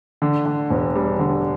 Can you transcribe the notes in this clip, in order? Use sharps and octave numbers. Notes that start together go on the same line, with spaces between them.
D3
D3
E1
G3
D3